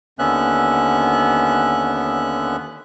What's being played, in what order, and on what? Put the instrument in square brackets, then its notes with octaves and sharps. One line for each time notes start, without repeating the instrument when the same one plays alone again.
[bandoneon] D#2 D3 B3 C#4 E5 F#6